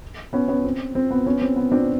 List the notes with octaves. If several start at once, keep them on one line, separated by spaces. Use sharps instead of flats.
B3 C#4
B3 C#4
C4
C4
B3
B3 C#4
C4
B3
C4 D4